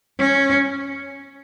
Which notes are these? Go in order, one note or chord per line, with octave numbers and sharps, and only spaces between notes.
C#4